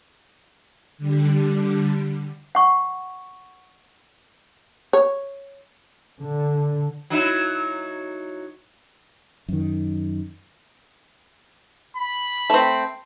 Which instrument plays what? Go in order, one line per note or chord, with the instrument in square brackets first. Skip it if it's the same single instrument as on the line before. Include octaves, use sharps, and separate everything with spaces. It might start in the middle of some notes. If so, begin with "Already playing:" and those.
[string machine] D3 G3
[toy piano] F#5 C#6
[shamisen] C#5
[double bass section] D3
[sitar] F#3 D#4 E4
[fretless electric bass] F#2 D#3
[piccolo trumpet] B5
[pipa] A3 C4